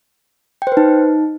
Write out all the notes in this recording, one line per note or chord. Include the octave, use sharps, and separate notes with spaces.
G5
C5
B4
D#4